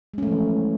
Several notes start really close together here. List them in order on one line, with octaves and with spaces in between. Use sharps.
G#3 C#4 A3 F3 E3